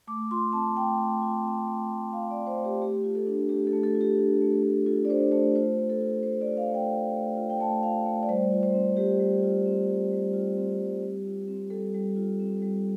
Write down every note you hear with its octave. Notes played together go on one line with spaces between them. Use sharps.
A3 D6
F4 C6
C4 A5
A3 G5
A3
F4
C4
A3
A3
F4 F5
C4 D5
C5
A3
G4
A3 G4
F4
A4
D4
A3 G4
A4
A3
A4
F4
G4
D4
A3
A3
F4 A4
D5
D4 C5
A3 C5
F4 C5
A3
A4
F4
A3 C5
D5
F4
F5
A3 G5
F4
A3
F4
G5
A3 A5
F4 F5
A3
D5
G3 C5
F4
C5
C4
G3 G4
G3
F4
C4
G3
G3
F4
C4
G3
G3
F4
C4
G3 A4
G3
F4
C4
G3